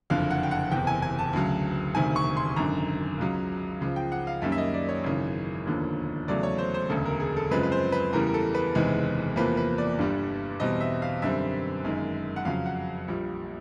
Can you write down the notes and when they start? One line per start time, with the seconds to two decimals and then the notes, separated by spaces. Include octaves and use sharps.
0.10 F#1 F2 D3 F5
0.30 F#5
0.43 G5
0.51 F#5
0.71 F#1 E2 C3 G5
0.87 G#5
1.02 G#5
1.19 A5
1.33 D2 C#3 F#3
1.95 E1 D2 C3 D#3 G#5
2.16 C#6
2.37 C6
2.56 G#1 F#2 D3 A#5
3.18 C#2 C#3 F#3
3.81 C#2 C#3 F3
3.96 G5
4.12 F#5
4.27 F5
4.42 F#2 D#3 G3 A#3 C#4 E5
4.52 E5
4.58 D#5
4.74 D5
4.89 C#5
5.04 G#1 F#2 C#3 E3
5.66 E1 D#2 D3 F3 A#3
6.28 E2 C#3 F#3 A3 D5
6.43 C#5
6.58 C5
6.74 C5
6.90 E1 D2 C#3 A4
7.05 A#4
7.20 G#4
7.36 A4
7.51 F#2 C#3 F3 G#3 C4 B4
7.63 B4
7.72 C5
7.92 B4
8.13 E2 C#3 E3 G3 A#4
8.27 A#4
8.34 A4
8.55 B4
8.75 F#1 E2 C3 D#3 G#3
9.36 E2 C3 F3 A#3 B4
9.57 B4
9.78 D5
9.99 G1 G2 D3 G3
10.60 E2 B2 G3 C4 D#5
10.81 E5
11.02 F5
11.22 F#2 D3 G3 C4 E5
11.84 G1 F#2 D#3 G#3
12.36 F#5
12.45 F2 C#3 F#3 F5
12.66 F#5
13.08 A#1 A#2 G3